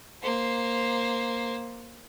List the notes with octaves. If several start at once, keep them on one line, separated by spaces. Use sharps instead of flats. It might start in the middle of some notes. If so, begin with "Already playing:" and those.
A#3 C5